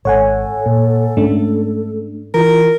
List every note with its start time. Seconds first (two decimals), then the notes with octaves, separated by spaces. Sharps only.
0.05 G#1 A4 C#5 F#5 G#5
0.66 A#2
1.17 G#2 A3 C#4 D4
2.34 E3 F4 A#4